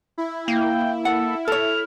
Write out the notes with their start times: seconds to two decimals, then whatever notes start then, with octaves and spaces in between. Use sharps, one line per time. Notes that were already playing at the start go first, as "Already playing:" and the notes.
0.18 E4
0.48 A#3 G5
1.05 A4 F#5
1.48 A4 C#5 F6